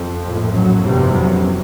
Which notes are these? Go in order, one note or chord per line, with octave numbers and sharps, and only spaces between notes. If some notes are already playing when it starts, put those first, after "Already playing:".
Already playing: F2 F3
A#1 A2
F#2 F#3
F1 E2 G2 C3 G3
F#2 F#3